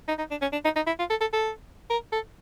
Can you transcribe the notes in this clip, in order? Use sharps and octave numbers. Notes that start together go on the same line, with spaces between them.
D#4
D#4
D4
C#4
D4
D#4
D#4
E4
F4
A4
A4
A4
A#4
A4